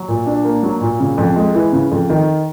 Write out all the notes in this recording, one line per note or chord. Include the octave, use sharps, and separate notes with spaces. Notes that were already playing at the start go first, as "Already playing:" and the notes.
Already playing: F#3
A#2
D4
A#3
F#3
A#2
C#3
F2
G#3
E3
C#3
F2
D#3